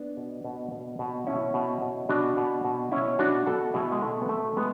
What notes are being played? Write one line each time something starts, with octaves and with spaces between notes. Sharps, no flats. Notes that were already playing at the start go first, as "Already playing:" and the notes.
Already playing: B3 D4
B2
B2
B2
B2
B2 C#4 E4
B2
B2
B2 D4 F#4
B2
B2
B2 C#4 E4
B2 D4 F#4
B2 F#4 A4
B2 E4 G#4
G#3
B2 A3
B3
B2 A3
B2 G#3 B3